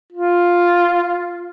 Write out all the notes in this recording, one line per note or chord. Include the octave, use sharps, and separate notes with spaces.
F4